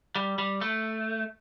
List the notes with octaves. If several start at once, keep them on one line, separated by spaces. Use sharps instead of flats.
G3
G3
A3